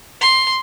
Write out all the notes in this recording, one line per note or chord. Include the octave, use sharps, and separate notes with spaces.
C6